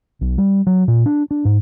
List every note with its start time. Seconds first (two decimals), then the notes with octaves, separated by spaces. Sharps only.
0.21 B1
0.38 G3
0.67 F#3
0.88 A#2
1.06 D4
1.31 D4
1.45 G#2